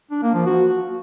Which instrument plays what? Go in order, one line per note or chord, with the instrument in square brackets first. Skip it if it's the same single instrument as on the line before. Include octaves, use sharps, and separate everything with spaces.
[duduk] D4
A#3
F3
F#4